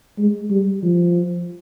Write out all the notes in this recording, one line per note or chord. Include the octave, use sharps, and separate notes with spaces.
G#3
G3
F3